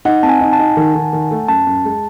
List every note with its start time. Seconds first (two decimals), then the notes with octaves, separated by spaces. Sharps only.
0.05 D#4 F#5
0.23 C4 A5
0.29 G#5
0.41 D#4
0.53 A5
0.59 D#4
0.77 D#3
0.95 D#3
1.13 D#3
1.31 A3
1.48 F#2 A5
1.67 F#2
1.85 G#3